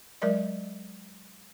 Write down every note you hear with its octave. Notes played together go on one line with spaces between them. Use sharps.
F#3 G#3 A#4 D5 D#5